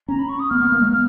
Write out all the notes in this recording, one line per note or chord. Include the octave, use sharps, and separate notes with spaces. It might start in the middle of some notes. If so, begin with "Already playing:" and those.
C#4 A#5
B5
C#6
D#6
B3 F6
B3
A#3
G#3
B3 F6